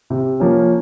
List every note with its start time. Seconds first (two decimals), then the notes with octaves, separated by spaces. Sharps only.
0.10 C3
0.40 F3 A#3 C#4